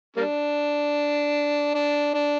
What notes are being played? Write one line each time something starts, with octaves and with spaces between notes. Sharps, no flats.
G3 A#3 D4
D4
D4